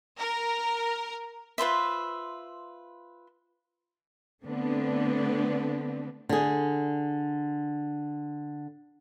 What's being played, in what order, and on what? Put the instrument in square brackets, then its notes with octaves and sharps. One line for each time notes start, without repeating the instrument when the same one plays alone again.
[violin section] A#4
[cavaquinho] F4 B4 C5 E5
[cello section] D3 A3 B3 C4 D4
[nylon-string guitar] D3 G#4